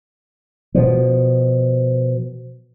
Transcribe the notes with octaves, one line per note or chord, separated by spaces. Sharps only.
B2 F3